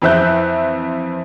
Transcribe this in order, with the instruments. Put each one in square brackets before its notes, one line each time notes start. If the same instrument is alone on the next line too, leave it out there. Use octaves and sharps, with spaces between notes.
[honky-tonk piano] F2 E3 C4 E5 F#6 G6